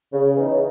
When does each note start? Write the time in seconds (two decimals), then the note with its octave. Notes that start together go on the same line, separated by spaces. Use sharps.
0.13 C#3
0.36 E3 B3 D#4